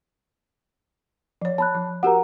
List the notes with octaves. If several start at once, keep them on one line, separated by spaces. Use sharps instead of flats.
F3 C#5
C#5 A5 B5 F#6
F3
F#4 G4 A#4 F#5 A#5